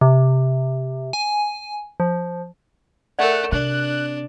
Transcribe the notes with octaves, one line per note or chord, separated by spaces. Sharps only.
C3
G#5
F3
A3 A#4 D5 F#5
C3 D4 F#6